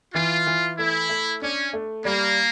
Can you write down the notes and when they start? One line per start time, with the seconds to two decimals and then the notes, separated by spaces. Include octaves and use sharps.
0.14 E3 F4
0.46 E3
0.78 A3 E4
1.09 A3
1.42 C#4 D4
1.73 A3
2.05 G3 A#3